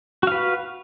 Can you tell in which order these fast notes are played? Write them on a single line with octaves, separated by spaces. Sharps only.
F#4 F5 B4